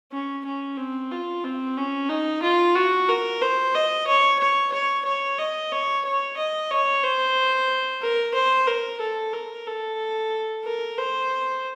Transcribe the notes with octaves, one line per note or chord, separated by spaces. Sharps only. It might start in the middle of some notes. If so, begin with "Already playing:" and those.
C#4
C#4
C4
F4
C4
C#4
D#4
F4
F#4
A#4
C5
D#5
C#5
C#5
C#5
C#5
D#5
C#5
C#5
D#5
C#5
C5
A#4
C5
A#4
A4
A#4
A4
A#4
C5